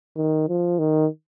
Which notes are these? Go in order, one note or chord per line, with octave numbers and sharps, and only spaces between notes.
D#3
F3
D#3